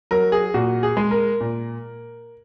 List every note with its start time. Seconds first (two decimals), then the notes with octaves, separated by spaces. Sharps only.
0.11 F#3 A#4
0.32 G#4
0.54 A#2 F#4
0.83 G#4
0.97 G#3
1.11 A#4
1.41 A#2